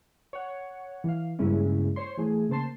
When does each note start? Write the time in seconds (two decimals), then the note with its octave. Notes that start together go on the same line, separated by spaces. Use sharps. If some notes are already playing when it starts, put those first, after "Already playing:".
0.33 C#5 F#5
1.04 E3 F5
1.39 G2 C#3 G#3 A#3 C#4 E4
1.96 C5 C#5 C6
2.17 E3 A3 G#4
2.49 C#3 A#3 C5 A5 C6